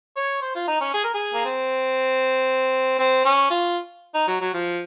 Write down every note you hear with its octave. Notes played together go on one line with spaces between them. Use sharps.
C#5
C5
F4
D#4
C#4
G#4
A#4
G#4
A#3
C4
C4
C#4
F4
D#4
F#3
F#3
F3